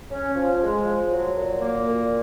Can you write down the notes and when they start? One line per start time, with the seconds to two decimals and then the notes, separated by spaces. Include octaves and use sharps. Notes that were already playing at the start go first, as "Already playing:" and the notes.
0.11 C#4
0.36 F3
0.60 G#3
0.85 F3
1.10 F#3
1.35 A#2
1.60 A#3
1.84 A#2